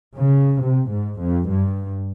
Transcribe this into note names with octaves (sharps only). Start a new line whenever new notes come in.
C#3
C3
G#2
F2
G2